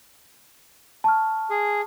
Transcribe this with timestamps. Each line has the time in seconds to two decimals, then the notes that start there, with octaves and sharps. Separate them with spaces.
1.04 A5 C#6 F6
1.50 G#4